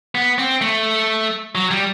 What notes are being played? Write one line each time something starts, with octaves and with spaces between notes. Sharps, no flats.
B3
C4
A3
F#3
G3